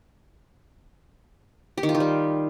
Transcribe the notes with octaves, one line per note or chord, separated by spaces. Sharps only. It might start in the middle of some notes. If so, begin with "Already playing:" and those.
G4
D#3
F4
D#3
G3